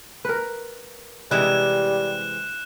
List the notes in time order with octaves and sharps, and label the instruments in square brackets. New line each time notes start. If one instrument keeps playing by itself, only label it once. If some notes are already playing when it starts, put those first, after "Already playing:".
[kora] A#4 B4
[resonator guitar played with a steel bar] C3 E3 G#3 [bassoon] G3 [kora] E4 [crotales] F#6 E7